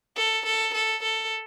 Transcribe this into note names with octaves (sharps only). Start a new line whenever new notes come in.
A4
A4
A4
A4